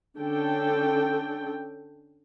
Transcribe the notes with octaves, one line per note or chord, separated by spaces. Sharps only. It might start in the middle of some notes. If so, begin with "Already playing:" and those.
D3 C#4 A4 G5